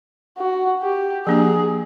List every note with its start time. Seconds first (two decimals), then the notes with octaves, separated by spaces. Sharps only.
0.38 F#4
0.82 G4
1.26 F3 A#3 D4 G4 G#4